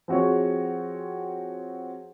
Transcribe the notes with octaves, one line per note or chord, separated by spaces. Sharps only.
F3 C4 F#4 G#4 C#5